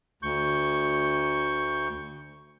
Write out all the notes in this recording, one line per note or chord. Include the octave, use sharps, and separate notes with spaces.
D2 C#6 G6